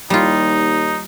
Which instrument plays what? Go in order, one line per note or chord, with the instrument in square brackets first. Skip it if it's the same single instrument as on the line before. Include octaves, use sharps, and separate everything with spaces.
[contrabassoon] D#2 [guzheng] G3 F4 [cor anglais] D#4